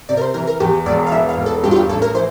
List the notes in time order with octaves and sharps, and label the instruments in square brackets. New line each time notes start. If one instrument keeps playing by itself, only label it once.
[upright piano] C3 [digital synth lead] D5
[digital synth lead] A#4
C5
[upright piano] E3 [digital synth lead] A#4
[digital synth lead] A#4
[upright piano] E2 [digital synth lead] G4
[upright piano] E1 [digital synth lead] D5
[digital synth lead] F5
[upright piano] E3 [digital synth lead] E5
[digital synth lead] F5
[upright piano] E1
[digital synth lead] A4
[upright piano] G2 [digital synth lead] G4
[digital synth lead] F4
G4
[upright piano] A1 [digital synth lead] A4
[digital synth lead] A#4
[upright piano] E3 [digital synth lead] C5